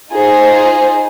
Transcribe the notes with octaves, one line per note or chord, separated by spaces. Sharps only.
D#4 F4 G#4 C5